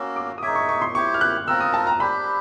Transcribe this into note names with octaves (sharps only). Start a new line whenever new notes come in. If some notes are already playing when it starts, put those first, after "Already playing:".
Already playing: A#3 C#4 F#4 E6
D6
D#6
D#4 G#4 C#5 E5 D6
C#6
C#6
C6
E4 G4 C5 C#6
F6
F#6
C4 F4 A#4 E6
D#6
A5
A#5
D4 G4 C5 B5